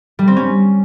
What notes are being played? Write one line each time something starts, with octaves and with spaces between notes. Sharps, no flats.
G3
C4
C#4